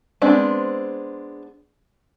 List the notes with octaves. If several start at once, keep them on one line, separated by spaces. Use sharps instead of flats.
G#3 B3 C4 D4